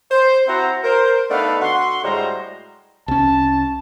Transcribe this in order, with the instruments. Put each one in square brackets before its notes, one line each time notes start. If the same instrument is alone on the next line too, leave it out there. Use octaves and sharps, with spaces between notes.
[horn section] C5
C4 E4 F#4 C5 F#5 A#5
A#4 C5
A3 B3 D4 D#4 F5 B5
D3 F#4 F#5 C6
A2 G3 G#3 F#4 C5 A#5
[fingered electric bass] C2 C#4 [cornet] A5